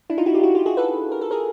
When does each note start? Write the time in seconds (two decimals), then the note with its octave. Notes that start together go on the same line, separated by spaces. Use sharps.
0.10 D4 E4
0.18 D#4 F4
0.26 E4 F#4
0.34 F4 G4
0.43 E4 F#4
0.55 F4 G4
0.66 F#4 G#4
0.77 A4 B4
1.12 A#4
1.21 A4
1.31 G#4 A#4